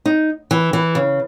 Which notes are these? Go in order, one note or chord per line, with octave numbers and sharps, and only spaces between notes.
D#4
E3
E3
C#3